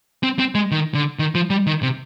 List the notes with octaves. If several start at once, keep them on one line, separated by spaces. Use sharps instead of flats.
C4
C4
G#3
D#3
D3
D#3
F3
G3
D#3
C3